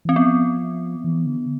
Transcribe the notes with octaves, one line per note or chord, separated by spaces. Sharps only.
E3 C4
F3 B3
E3
D3